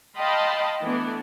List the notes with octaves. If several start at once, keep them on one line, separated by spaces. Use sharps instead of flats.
D#5 F5 G5 A5 B5 C6
E3 A3 B3 D4